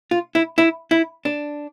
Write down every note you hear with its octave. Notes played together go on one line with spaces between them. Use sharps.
F4
E4
E4
E4
D4